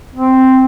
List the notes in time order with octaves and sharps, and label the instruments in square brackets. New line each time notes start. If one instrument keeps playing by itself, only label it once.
[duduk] C4